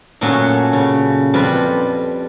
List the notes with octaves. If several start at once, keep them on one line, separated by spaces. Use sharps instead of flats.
F#2 A#2 A3 C#4 F#4
C#3
F2 G3 F4 B4